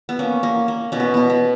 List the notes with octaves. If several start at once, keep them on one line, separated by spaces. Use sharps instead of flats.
B3
A#3 C#4
A#3
A#3
B2 C#4
B3
B2 B3
B3